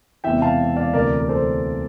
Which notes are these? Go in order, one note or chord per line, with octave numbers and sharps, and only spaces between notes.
E1 E2 C3 E3 E5 G5
F5 A5
D5 F5
D2 C3 E3 A#4 D5
A#4
A4 C5